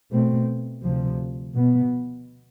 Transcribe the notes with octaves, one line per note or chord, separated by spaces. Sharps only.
B2 A3 C4
D2 C3 F3
B2 B3